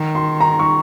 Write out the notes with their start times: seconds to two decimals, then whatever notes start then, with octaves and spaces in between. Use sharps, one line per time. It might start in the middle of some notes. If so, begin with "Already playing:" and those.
Already playing: D#3
0.15 C6
0.40 A#5
0.59 C#6